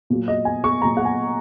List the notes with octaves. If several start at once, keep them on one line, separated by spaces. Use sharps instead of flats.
A#2 F#3
D#5
G#5
C#6
A#2 F#3 A#5
F#5
G#5